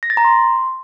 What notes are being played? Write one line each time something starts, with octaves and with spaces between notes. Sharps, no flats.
A#6
A6
A#5
C6